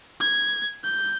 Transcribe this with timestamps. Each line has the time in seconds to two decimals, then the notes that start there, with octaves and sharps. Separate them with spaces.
0.20 G#6
0.84 G6